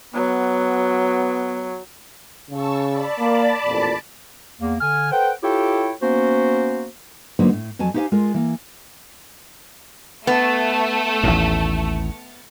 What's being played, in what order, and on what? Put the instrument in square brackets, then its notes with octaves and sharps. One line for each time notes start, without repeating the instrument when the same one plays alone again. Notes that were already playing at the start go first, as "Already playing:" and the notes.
[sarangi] F#3 [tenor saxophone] B3
[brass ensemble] C#3 [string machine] A5 C#6 E6
[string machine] D5 A5 B5
[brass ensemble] A#3
A1 F2 A#2
[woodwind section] E2 A#3
D3 G#5 F6
A4 B4 C5 F#5 G5
E4 F4 G4 A4 C#5 G5
A#3 B3 C#4 F#4 C5
[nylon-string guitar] D3 F#3 A#3 B3 D#4 C5
A2
F2 F#3 G#5 A5
D#4 E4 G4 C5 F5 G#5
G#3 F4 A#4
E3 A#3
[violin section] A3 [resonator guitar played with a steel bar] B3
[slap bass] A1 D#2 A2